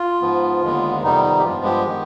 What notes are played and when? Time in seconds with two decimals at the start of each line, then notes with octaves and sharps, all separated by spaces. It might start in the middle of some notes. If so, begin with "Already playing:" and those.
Already playing: F4
0.21 G#2 F3 B3
0.63 D#2 D3 G#3 B3
1.03 F2 C3 D#3 G3 B3 D#4
1.24 D#4
1.39 G4
1.44 G2 F3 G#3 B3 F4
1.64 G4
1.87 D#3 G#3 B3